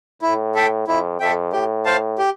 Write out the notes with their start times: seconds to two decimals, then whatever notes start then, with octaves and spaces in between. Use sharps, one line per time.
0.22 A2 E4
0.55 A4 E5 G5
0.87 F2 E4
1.20 F2 A4 E5 G5
1.53 A2 G4
1.85 C5 F5 A5
2.18 G4